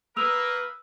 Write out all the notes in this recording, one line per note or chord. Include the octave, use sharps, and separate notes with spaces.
A#3 A#4 B4 D#6 E6 F7